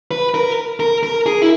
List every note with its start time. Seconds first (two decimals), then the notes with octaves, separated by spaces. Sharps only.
0.11 B4
0.34 A#4
0.80 A#4
1.03 A#4
1.26 G#4
1.42 E4